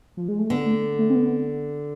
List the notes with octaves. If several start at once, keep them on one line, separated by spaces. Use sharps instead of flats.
F3
G#3
A3
D3 B3
A3
A3
C4
B3